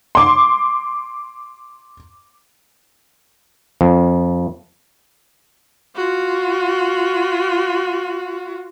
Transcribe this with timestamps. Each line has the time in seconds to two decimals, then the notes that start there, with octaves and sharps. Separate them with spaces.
0.15 C6 D6
3.81 F2
5.96 F4 F#4